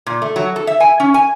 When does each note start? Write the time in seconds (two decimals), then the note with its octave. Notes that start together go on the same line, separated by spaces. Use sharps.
0.06 A#2
0.22 A3
0.36 F#3
0.56 A4
0.67 E5
0.80 G#5
1.00 C#4
1.14 G#5